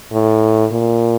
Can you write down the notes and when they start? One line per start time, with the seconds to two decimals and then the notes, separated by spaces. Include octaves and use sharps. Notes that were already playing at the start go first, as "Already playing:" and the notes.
0.12 A2
0.72 A#2